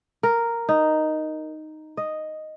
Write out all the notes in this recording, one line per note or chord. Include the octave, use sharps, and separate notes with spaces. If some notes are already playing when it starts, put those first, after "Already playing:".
A#4
D#4
D#5